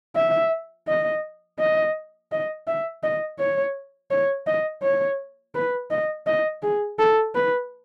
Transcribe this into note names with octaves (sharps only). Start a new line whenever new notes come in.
E5
D#5
D#5
D#5
E5
D#5
C#5
C#5
D#5
C#5
B4
D#5
D#5
G#4
A4
B4